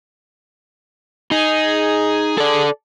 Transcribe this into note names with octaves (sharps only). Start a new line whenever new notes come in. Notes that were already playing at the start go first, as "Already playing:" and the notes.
D#4 G#4
A4 D5